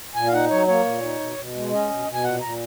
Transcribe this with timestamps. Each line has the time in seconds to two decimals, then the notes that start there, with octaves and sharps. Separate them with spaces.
0.16 A#2 G#5
0.27 F5
0.33 D#4 F#5
0.50 F#3 C#5
0.67 A#3 C#5
0.85 A#2
1.02 D#4
1.20 B2
1.37 B2
1.55 G#3
1.72 C#4 D#5
1.89 B2
2.06 B2
2.14 G#5
2.24 A#2 F#5
2.41 A#2 A#5